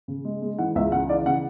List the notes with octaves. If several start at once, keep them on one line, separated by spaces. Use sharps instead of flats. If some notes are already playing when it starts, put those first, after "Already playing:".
C#3
G#3
G#3
E3 F#5
C#2 E5
C#3 F#5
E3 D5
C#3 F#5